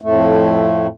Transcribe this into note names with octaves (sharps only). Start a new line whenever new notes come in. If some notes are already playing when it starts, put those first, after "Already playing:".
F2 A2 A3